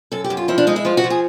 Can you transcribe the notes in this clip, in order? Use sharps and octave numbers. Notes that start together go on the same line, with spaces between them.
F#2 A4
G4
F#2
F4
F3 E4
D4
G#3 D#4
E4
F3 F4
F#4
F3
G#4